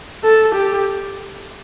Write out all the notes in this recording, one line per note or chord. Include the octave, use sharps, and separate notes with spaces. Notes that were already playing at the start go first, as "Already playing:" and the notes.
A4
G4